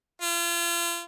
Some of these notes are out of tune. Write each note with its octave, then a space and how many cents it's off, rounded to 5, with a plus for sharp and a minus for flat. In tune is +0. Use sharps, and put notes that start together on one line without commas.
F4 -35